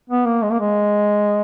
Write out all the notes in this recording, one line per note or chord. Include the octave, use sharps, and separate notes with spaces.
B3
A#3
G#3
A#3
G#3